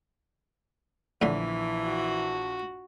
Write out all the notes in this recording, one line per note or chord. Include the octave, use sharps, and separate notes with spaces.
A#1 A2 D3 E3 C6
F#4